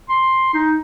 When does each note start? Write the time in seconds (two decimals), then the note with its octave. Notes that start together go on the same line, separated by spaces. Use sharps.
0.10 C6
0.54 D#4